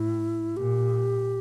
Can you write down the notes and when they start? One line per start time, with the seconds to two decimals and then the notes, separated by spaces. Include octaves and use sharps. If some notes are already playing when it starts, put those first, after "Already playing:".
Already playing: A2 E4
0.57 A#2 G4